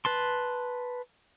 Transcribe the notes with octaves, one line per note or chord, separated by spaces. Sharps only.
B4 A5 C6